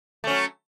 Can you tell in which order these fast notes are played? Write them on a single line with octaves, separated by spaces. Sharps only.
A3 C#4 F#3